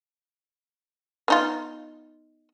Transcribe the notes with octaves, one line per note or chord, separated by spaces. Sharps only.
B3 D#4 F4